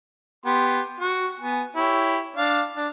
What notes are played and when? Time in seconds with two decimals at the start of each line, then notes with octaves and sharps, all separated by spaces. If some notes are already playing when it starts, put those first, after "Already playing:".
0.46 B3 G4 C6
1.00 F#4
1.40 B3 G#5
1.76 E4 G4 C#5
2.37 D4 F5
2.77 D4